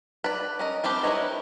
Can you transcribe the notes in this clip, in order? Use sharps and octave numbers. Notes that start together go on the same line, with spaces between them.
B4 D5
C#4 A#4 D#5
G3 C4 D4 G4
E4 A#4 B4 C#5 D#5